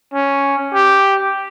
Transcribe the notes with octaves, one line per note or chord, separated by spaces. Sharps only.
C#4
G4